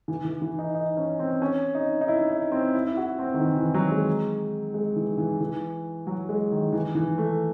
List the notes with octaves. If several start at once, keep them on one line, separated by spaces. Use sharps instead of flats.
E3
E3
E3
D#4
D#4
C#4
C4
C#4
D#4
D#4
E4
D#4
C4
E4
E4
F#4
C4
D#3
E3
E3
F#3
G#3
G#3
E3
E3
E3
F#3
G#3
D#3
E3
E3
A3